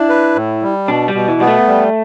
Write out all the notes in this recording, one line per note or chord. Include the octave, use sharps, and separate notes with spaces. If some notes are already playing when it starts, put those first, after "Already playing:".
Already playing: D4 E4
B4
A2
G3
B2 D4
G3
B2
E3
G3 B3
A3
G3